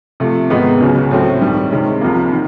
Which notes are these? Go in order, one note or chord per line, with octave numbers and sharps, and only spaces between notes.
C3 F3 A3
G#2 D#3 G#3 B3 D#4
C#2 C#3 F#3
A2 F#3 A3 C4
G2 D#3 G3
C3 D#3 G#3 C#4
C2 C3 F3 A#3
D#3